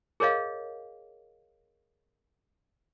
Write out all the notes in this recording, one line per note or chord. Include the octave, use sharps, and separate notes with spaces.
G#4 A#4 C#5 D#5 F5